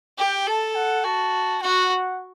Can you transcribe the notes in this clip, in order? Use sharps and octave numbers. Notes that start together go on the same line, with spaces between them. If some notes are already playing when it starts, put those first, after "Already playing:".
G4 G5
A4 A5
F#5
F#4 A5
F#4 F#5